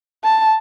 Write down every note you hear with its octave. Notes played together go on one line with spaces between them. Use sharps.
A5